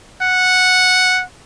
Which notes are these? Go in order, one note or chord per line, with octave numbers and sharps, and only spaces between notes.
F#5